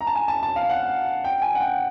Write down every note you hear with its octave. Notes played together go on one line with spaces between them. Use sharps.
A#5
A5
G#5
A5
A5
F5
F#5
G5
G#5
F#5
G5